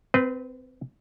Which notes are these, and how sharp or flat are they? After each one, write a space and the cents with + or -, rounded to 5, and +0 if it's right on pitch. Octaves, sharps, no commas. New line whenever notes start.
C4 -25 B4 +0